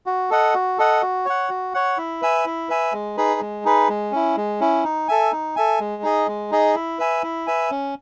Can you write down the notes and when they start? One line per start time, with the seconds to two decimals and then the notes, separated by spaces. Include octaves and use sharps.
0.06 F#4
0.30 A4 D#5 F#5
0.54 F#4
0.78 A4 D#5 F#5
1.02 F#4
1.26 C#5 F#5
1.50 F#4
1.74 C#5 F#5
1.97 E4
2.22 B4 E5 G#5
2.45 E4
2.69 B4 E5 G#5
2.93 G#3
3.17 D#4 G#4 B4
3.41 G#3
3.64 D#4 G#4 B4
3.89 G#3
4.12 C#4 E4
4.36 G#3
4.60 C#4 E4
4.84 D#4
5.08 A4 E5 G#5
5.32 D#4
5.56 A4 E5 G#5
5.80 G#3
6.03 D#4 G#4 D#5
6.27 G#3
6.51 D#4 G#4 D#5
6.75 E4
6.99 B4 E5 G#5
7.23 E4
7.47 B4 E5 G#5
7.71 C#4